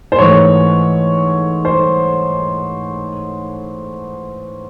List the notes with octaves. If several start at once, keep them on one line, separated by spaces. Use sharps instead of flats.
C5
G#2 E3 A3 C#5
C5